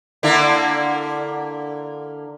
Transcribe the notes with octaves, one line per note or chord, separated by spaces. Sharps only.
D3 A#3 E4